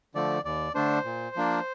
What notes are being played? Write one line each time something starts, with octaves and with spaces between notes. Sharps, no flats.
D3 F3 A3 D5
D#2 D5
D3 A3 D4 C5
A#2
F3 A#3 D4